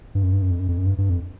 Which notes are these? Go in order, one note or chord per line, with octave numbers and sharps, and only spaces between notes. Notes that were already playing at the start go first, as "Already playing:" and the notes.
G2
F#2
G2
F#2
F2
F#2
F2
F#2
G2
G2
F2